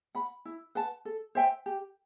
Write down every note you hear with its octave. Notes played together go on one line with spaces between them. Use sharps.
F#5 B5
E4
B4 F#5 A5
A4
C5 E5 G5
G4